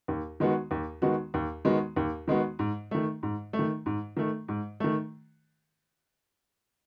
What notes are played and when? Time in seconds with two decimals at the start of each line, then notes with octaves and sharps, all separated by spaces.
0.08 D#2
0.40 D#3 G#3 B3 F#4
0.71 D#2
1.02 D#3 G#3 B3 F#4
1.34 D#2
1.65 D#3 G#3 B3 F#4
1.96 D#2
2.28 D#3 G#3 B3 F#4
2.59 G#2
2.91 D#3 A3
3.23 G#2
3.53 A3
3.59 D#3
3.86 G#2
4.17 D#3 A3
4.48 G#2
4.80 D#3 A3